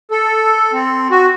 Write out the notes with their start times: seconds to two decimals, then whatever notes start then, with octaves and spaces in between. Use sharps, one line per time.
0.11 A4
0.73 C4
1.11 F#4